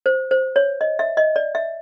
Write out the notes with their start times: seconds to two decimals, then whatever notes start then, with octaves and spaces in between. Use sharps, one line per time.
0.06 C5
0.31 C5
0.56 C#5
0.81 D#5
0.99 E5
1.17 D#5
1.36 D5
1.55 E5